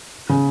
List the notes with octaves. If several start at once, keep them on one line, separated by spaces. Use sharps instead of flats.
C#3